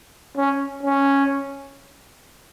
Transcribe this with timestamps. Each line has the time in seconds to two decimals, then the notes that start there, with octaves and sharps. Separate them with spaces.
0.37 C#4
0.83 C#4